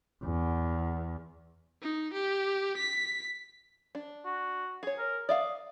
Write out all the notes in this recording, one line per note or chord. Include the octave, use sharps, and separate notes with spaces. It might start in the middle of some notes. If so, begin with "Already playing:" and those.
E2
D#4
G4
B6
D4
F#4
G#4 C#5
A#4
D5 E5 F5 D#6